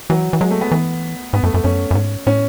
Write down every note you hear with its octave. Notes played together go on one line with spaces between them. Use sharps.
E3 F#3
E3
F#3 G#3
A3
B3
E3
G#2 B3
F#2 A3
F#2 A3
F#2 C#4
F#2
G#2
A2 C#4